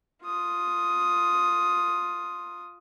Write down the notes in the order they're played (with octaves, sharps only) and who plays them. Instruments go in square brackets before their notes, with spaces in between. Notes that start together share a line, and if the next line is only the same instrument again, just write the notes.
[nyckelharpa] F4 D#6